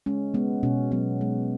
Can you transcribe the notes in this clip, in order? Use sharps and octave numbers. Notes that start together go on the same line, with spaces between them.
G#3 C#4
G#3 B3
B2 C#4
F#3 B3
G#3